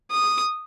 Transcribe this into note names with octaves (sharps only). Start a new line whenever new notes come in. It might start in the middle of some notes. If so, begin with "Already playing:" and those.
D#6